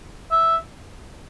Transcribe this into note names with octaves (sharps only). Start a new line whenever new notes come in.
E5